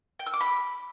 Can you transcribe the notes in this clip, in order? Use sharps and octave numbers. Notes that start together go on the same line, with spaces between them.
G5
E6
D6
B5